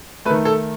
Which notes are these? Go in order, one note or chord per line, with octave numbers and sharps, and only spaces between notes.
D#3 A3 B4
A4